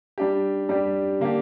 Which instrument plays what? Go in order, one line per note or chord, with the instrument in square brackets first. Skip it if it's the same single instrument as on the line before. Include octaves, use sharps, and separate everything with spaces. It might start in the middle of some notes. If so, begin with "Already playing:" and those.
[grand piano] G3 D4 G4
G3 D4 G4
D3 A#3 D4 G4